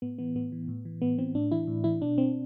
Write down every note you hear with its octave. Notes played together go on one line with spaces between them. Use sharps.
A2 B3
E3 B3
A2 B3
E3
A2
E3
A2 B3
E3 C4
A2 D4
E3 E4
A2
E3 E4
B2 D4
C4